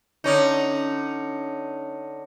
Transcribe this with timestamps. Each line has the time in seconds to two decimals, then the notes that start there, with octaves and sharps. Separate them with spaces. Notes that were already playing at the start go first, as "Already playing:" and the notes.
0.24 D3 C#4 D#4